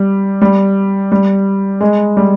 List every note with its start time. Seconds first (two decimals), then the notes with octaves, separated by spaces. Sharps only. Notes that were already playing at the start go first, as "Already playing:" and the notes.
Already playing: G3
0.42 G3
1.12 G3
1.81 G#3
2.17 G3